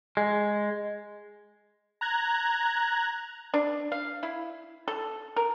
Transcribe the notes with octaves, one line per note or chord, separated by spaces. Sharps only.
G#3
A#5 F#6 G#6
D4
F5
E4
A4
A#4